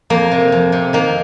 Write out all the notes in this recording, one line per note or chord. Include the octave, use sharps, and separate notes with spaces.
F2 A#3
C3
F2
C3
D#3 A#3